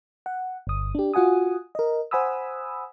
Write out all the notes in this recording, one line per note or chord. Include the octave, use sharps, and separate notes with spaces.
F#5
G1 D#6
D4 G4
F4 F#4 F#5 G#5 D#6
A#4 D#5
C5 F#5 G#5 B5 D#6 E6